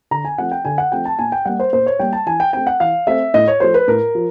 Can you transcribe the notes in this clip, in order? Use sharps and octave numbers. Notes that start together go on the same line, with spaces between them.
D3 A#5
G#5
F3 A3 C4 F#5
G5
D3 G#5
F#5
F3 A3 C4 G5
A5
A#2 G#5
G5
G3 A#3 F#5
C5
A#2 C5
C#5
G3 A#3 G5
A5
E3 G#5
G5
A3 C4 G5
F#5
E3 F5
A3 C4 E5
A2 D#5
C#5
F3 A3 C5
B4
A2 A#4
F3